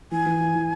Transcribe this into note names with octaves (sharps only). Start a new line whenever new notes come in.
E3 G#5
E3
E4
E3